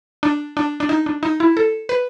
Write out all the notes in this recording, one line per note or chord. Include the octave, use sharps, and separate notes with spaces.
D4
D4
D4
D#4
D4
D#4
E4
A4
B4